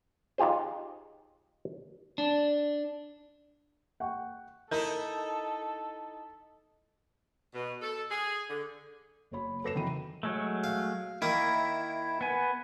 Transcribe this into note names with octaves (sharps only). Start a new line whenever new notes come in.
D#4 F4 G4 G#4 C5
D4
F#5 G5 C#6
D#4 E4 A4 A#4 A#5
B2
A4
G#4
D3
F#1 F#3 C#5 B5
F#3 A4 B4 A#6 C7 E7
F2 D#3 E3 B5 D#7
F#3 G#3 A3
F5
D#3 A#3 E4 D#6
B3 G#5